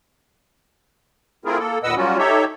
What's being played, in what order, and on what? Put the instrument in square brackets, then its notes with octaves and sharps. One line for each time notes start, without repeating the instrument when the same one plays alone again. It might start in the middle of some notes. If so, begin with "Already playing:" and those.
[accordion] A3 C4 E4 F4 G#4 A#4
A#3 A4
D#2 A#2 B4 D#5 F#5 E6
F#3 G3 A#3 C#4 F4 F#4
D#4 G4 A4 C#5 E5